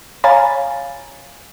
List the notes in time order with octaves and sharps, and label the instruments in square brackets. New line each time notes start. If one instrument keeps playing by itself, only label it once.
[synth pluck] C#5 F5 G#5 A#5 B5 A6